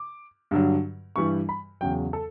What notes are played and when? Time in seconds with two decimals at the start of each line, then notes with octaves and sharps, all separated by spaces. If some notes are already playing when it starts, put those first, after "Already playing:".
Already playing: D6
0.51 G2 D3 F#3
1.16 G2 E3 G3 C#6
1.49 B5
1.81 E2 C#3 F#3 G5
2.13 A4